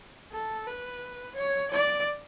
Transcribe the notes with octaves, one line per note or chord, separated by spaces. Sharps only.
A4
B4
C#5
D5